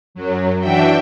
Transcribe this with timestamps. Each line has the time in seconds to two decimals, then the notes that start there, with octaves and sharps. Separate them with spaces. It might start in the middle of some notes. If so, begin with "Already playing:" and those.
0.15 F#2 F#3
0.60 E3 D4 F#4 E5 G5